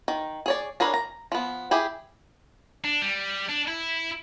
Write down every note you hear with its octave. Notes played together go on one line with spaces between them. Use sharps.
D#3
G#4 C#5 D5
D4 G#4 A#4 B4 C#5
A#5
F3 B3
E4 G4 G#4
D4
G3
D4
E4